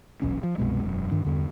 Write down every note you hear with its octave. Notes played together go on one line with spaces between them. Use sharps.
D#1 B1 E2 C#4
F3
C2 F#2 B2 G#3
E1 F#2
G2 D#3 D4
E2 G2 D3